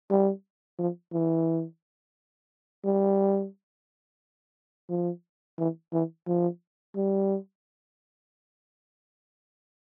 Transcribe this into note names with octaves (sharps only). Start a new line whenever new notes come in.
G3
F3
E3
G3
F3
E3
E3
F3
G3